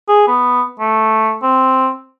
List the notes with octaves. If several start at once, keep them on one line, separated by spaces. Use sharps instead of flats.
G#4
B3
A3
C4